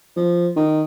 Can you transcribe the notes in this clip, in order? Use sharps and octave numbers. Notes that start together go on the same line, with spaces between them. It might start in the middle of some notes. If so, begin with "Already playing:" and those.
F3
D#3